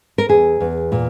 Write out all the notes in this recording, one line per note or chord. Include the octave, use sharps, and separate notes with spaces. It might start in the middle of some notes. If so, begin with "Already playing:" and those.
A#4
E2 G#4
E2
A#2